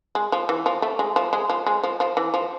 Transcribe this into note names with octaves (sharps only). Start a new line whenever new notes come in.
G#3
F3
E3
F3
A3
G#3
F3
G#3
F3
G#3
F3
F3
E3
F3